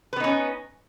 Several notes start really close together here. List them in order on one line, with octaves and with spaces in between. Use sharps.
B4 B3 D#4 C#4